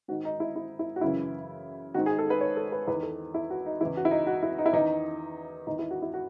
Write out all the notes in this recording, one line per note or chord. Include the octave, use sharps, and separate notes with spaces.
G#2 D#3 F#4
D#4
E4
E4
E4
F#4
F#2 C#3 E3 E4
G#2 D#3 F#4
G#4
A4
B4
C#5
A4
B4
E2 D#3 B4
A4
E4
F#4
D#4
E2 C#3 E3 E4
F#4
E4
D#4
F#4
E4
D#4
E4
E2 D#3 D#4
E2 D#3 D#4
E4
F#4
E4
F#4